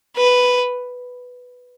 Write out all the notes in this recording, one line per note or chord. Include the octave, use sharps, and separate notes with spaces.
B4